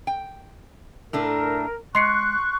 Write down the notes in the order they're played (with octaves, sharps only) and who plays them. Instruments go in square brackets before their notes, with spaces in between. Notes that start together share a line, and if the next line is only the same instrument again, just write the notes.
[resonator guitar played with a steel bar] G5
[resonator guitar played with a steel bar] A2 A3 D4 [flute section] A#4
[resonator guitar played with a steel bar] G#3 [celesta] C6 C7 C#7 [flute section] C#6 F#6